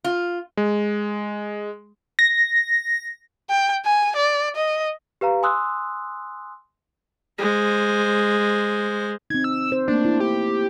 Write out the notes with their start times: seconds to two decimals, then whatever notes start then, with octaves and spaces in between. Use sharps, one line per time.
0.04 F4
0.57 G#3
2.19 A#6
3.50 G5
3.85 G#5
4.16 D5
4.56 D#5
5.21 G4 B4 F5 A#5
5.43 G#5 C6 D#6 E6 F#6
7.38 G#3 C5
9.30 C4 D#4 G#6
9.44 E6
9.72 C5
9.88 A3 A#3 D4
10.05 E4
10.20 G4